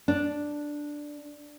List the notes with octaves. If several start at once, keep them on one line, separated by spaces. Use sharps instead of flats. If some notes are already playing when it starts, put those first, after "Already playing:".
D4